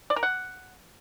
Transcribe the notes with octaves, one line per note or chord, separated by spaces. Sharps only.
D5
A#4
F#5